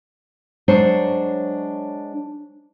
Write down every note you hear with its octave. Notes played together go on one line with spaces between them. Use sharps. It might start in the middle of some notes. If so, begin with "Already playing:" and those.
F#3 G#3 D4 C5 C#5